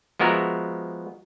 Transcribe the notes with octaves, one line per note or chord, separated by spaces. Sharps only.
F3 G#3 B3 F#4 A#4 E5